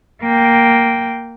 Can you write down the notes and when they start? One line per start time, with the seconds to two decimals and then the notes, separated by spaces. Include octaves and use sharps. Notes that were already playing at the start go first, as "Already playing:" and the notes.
0.22 A#3 G5